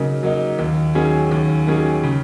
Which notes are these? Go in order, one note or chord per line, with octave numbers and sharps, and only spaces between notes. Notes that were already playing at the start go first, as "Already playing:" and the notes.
Already playing: C#3 F#3 A#3 D#4
F#3 A#3 D#4
D#2
D#3 F#3 C#4 G#4
D#2
D#3 F#3 C#4 G#4
C#3